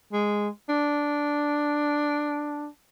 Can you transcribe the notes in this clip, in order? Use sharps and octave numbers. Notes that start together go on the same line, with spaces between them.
G#3
D4